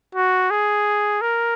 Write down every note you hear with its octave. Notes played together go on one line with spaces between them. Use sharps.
F#4
G#4
A#4